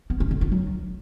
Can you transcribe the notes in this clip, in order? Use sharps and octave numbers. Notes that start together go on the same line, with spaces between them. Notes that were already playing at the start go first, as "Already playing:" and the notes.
B3
C#4
D3
F4
F#3